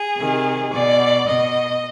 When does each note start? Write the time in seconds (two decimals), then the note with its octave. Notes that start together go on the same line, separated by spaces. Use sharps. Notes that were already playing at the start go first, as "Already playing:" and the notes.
Already playing: G#4
0.17 C3 D#3
0.71 B2 D5
1.27 B2 D#5